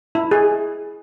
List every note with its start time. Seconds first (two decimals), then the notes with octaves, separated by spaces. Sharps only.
0.15 E4
0.31 G#4